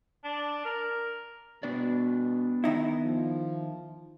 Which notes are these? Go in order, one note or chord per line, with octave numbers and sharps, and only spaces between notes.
D4
A#4
B2 B3 D4 D5
D#3 D#4 E4
F3